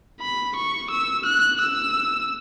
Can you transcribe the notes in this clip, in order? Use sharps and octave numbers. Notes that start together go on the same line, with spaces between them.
B5
C#6
E6
F#6
E6